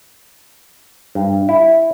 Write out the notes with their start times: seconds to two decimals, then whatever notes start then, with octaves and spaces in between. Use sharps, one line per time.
1.15 G2
1.49 E4